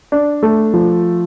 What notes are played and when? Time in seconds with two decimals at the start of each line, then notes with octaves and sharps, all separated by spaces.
0.12 D4
0.43 A3
0.74 F3